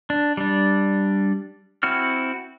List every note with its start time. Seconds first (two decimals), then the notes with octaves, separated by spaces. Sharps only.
0.10 D4
0.37 G3 D4
1.83 C4 E4 F#4 F6